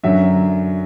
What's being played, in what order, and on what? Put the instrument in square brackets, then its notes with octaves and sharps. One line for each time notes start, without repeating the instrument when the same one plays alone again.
[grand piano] F#2 D3 F#3 E5